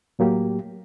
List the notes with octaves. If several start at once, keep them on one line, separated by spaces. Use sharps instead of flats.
A2 F#3 A#3 G4